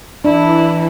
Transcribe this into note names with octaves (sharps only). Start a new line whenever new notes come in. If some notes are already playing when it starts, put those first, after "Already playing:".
E3 D4 E4